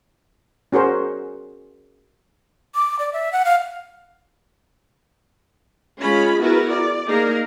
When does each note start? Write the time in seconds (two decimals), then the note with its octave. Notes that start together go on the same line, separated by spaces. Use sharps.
0.72 C#4 F#4 G#4 A#4 C5
2.75 D6
2.99 D5
3.13 E5
3.32 F#5
3.45 F5
6.00 G#3 C#4 F4 G#4 B5
6.41 B3 E4 F#4 G#4 A#4 B4
6.70 D5
7.08 A#3 D#4 G#4 A#4